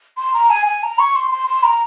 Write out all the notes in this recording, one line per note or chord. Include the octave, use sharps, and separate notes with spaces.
C6
A#5
G#5
G#5
A#5
C#6
C6
C6
C6
A#5